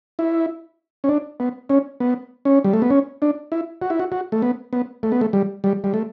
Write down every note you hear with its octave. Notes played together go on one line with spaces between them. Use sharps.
E4
C#4
D4
B3
C#4
B3
C#4
G3
A3
B3
C#4
D4
E4
F#4
E4
F#4
F#4
A3
B3
B3
A3
B3
A3
G3
G3
G3
A3